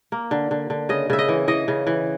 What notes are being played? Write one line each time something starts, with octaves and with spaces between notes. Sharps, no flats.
A#3
D3
D3
D3
C#3 D#5
C#3 E5
D#5
E3
E3 D#5
C#3
E3